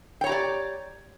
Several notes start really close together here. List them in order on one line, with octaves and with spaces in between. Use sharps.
G5 C#5 A#5 G4 D5